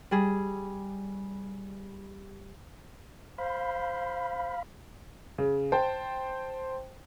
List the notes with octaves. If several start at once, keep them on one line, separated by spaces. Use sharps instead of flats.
G3 G#4
C5 F5 B5
C#3
C5 G5 A5